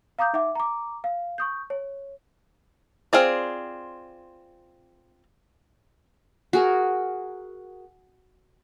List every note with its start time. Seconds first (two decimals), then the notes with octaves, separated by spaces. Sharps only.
0.19 F5 A#5 D6 D#6 G6
0.34 D#4 E5 F#5 D6
0.55 A#5 D6
1.04 F5
1.38 C#6 D#6 G6
1.70 C#5
3.13 C4 F4 G#4 D5
6.53 F#4 G#4 A#4